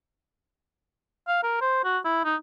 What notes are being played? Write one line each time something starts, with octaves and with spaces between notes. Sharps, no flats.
F5
A#4
C5
F#4
E4
D#4